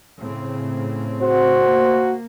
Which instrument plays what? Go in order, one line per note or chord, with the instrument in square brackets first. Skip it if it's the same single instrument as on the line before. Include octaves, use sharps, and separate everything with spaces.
[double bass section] A2 C#3 C4
[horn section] F#4 [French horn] C5
[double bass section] A#3